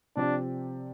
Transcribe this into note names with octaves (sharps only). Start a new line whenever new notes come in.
C3 F3 C4 D4 G4 D5